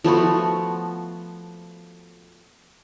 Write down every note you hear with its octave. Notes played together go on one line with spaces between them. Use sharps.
F3 A3 B3 F#4